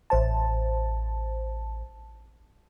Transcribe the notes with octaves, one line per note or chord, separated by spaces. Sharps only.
A1 C5 A5